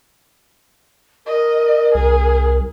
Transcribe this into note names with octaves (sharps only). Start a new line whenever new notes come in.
A#4 D#5
C2 G#4